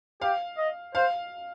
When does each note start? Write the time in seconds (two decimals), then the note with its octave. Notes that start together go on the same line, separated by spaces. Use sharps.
0.22 G4 F5
0.58 D#5
0.95 C5 F5